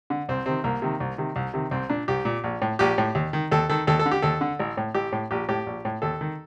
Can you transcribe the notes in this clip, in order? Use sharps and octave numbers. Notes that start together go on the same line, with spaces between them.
D3
C2 C4
C3 D#3 C4
C2 A#3
C3 D#3
C2
C3 D#3
C2
C3 D#3
C2 C4
A#2 D4
C2 G4
A#2
A#1
A2
A#1 G4
A2
D#2
D#3
D#2 A4
D#3 A4
D#2 A4
A4
D3
G4
D#2 A4
D3
A1
A2
A1 G4
A2
A#1 G4
A2 G4
A#1
A2
D#2 A4
D#3